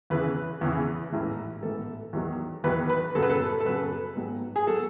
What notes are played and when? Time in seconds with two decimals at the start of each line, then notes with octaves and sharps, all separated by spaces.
0.10 E2 C#3 E3 B4
0.61 E2 C#3 E3
1.12 A1 G#2 E3
1.63 A1 G#2 E3 A4
2.13 E2 D#3 F#3
2.64 E2 D#3 F#3 B4
2.89 B4
3.15 F#2 C#3 F#3 A4
3.23 B4
3.30 A4
3.60 A4
3.66 F#2 C#3 F#3 B4
4.16 G#1 G#2 F#3
4.56 G#4
4.67 F#3 A4